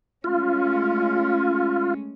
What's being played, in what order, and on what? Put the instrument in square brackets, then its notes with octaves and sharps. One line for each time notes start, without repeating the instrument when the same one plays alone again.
[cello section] G#3 A3 C#4 [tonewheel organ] F4